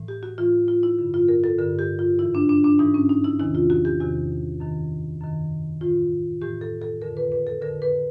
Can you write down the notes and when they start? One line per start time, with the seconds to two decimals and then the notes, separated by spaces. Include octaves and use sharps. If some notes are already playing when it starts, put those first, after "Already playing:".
Already playing: A2 E3
0.08 G4
0.23 F#4
0.38 A2 E3 F4
0.68 F4
0.83 E4
0.99 G2 D3
1.14 F4
1.28 A#4
1.44 A4
1.59 G2 D3 A#4
1.79 G4
1.99 F4
2.19 G#2 E3 E4
2.35 D4
2.49 D4
2.64 D4
2.79 G#2 E3 D#4
2.94 C#4
3.09 D#4
3.24 E4
3.40 E2 C3 D#3 E4
3.55 F4
3.70 F#4
3.85 G4
4.00 E2 C3 D#3 F#4
4.60 F#2 D#3
5.20 F#2 D#3
5.81 A2 E3 F4
6.41 A2 E3 G4
6.61 A4
6.82 A4
7.02 F2 D3 A#4
7.17 B4
7.32 B4
7.47 A4
7.61 F2 D3 A#4
7.82 B4